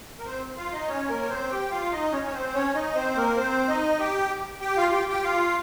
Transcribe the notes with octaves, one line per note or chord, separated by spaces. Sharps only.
A#4
C4 C5
F4 F5
D#4 D#5
C#4 C#5
A#3 A#4
C#5
C4 C5
G4 G5
F4 F5
D#4 D#5
C#4 C#5
C#5
C4 C5
C#4 C#5
D#4 D#5
C4 C5
A#3 A#4
C4 C5
D#4 D#5
G4 G5
G4 G5
F4 F5
G4 G5
G4 G5
F4 F5